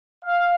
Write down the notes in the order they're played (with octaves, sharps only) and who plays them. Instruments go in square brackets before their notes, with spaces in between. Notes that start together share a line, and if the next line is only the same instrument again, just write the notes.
[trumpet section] F5